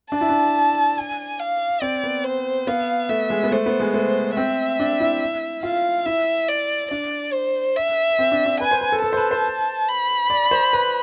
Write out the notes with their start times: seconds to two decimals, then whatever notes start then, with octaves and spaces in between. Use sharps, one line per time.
0.12 D4 A5
0.21 E4
0.30 D4
0.97 G#5
1.40 F5
1.82 C4 D5
2.04 B3
2.24 C5
2.67 B3 F5
3.09 A3 E5
3.30 G#3
3.44 B3
3.52 A3 C5
3.66 B3
3.80 G#3
3.94 A3 C5
4.36 C4 E5
4.80 D4
5.00 E4
5.63 F4 F5
6.06 E4 E5
6.48 D5
6.91 D4 D5
7.33 C5
7.76 E5
8.19 C4
8.32 D4
8.46 D4
8.61 B4 G#5
8.71 C5
8.81 B4
8.92 A4
9.02 A4 A5
9.13 C5
9.17 B4
9.31 C5
9.88 B5
10.30 D5
10.51 C5
10.73 B4